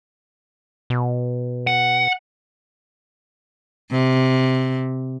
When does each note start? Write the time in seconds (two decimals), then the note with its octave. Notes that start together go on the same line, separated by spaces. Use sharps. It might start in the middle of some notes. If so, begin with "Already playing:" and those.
0.90 B2
1.67 F#5
3.91 C3